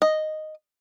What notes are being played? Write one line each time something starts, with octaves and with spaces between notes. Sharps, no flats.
D#5